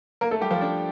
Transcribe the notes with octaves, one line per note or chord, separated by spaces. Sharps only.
A#3 A#4
A3 A4
G3 G4
F3 F4
D4